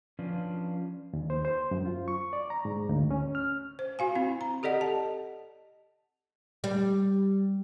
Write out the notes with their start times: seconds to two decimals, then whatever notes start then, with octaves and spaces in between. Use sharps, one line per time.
0.19 F3 C#4 D4 F4 B4 D5
1.13 D#2
1.30 C5
1.45 C5
1.71 F#2
1.85 F4
2.08 C#6
2.33 D5
2.50 A#5
2.65 G#2
2.89 D2
3.11 C#4
3.35 F6
3.79 C5
3.99 F#4 F5 G#5
4.15 C4 E4
4.41 A#5
4.63 G4 A4 D5 D#5 F#5
4.81 A5
6.64 G3